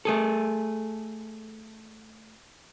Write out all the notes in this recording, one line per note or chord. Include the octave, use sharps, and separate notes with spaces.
A3 G#4 A4